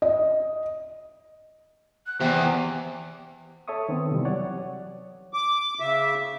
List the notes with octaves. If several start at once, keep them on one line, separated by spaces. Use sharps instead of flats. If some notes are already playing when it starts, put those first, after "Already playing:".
D#5
F#6
E2 C3 G5
A4 C#5 E5 C#6 D#6
D#3 B3 C4
C3 E3 G3
F#3 C#5 D5 F#5
D6
C#3 E5